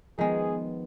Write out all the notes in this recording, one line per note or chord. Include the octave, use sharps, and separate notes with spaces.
D#3 F3 G#3 B3 G#4